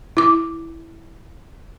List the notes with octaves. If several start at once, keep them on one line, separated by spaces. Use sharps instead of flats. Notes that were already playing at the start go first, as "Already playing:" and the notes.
E4 D6